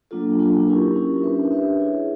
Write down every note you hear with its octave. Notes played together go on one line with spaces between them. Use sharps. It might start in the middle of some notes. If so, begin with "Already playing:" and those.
F#3 A#3 D4 F4 A4
F#3 A#3 D4 F4 A4
C#4 E4 G4 A#4
C#4 E4 G4 A#4
D4 G4 B4 E5
D4 G4 B4 E5
E4 G#4 C#5